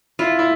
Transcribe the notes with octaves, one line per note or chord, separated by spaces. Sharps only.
E4 F4
E4